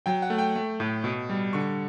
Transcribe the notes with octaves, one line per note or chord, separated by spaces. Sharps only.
F#3 G5
F#5
A3
G5
A3
A2
B2
G3
D3 C#6